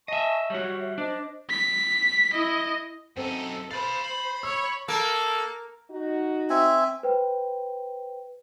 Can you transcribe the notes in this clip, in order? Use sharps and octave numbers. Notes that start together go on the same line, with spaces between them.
D#5 E5 G#5 A5 C#6
G3 F#4 C#5 C#6
E5
D4 C5 D#5 D6
B6
E4 D#5
F#2 C4 D#4 A4
C5 F5 B5 A6
B5
C#5 E6
A#3 A4
D#4 F#4
C4 E5 G#5
B4 C5 G5